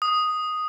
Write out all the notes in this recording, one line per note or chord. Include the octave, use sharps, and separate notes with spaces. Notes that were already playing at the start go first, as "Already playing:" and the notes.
D#6